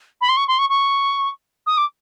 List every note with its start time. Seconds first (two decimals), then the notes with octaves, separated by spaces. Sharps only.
0.21 B5
0.29 C6
0.37 C#6
0.48 C6
0.59 C#6
0.69 C#6
1.66 D#6
1.77 D6